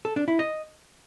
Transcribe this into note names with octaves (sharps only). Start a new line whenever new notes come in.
A4
D4
E4
D#5